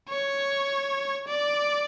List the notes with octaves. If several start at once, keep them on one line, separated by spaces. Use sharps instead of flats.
C#5
D5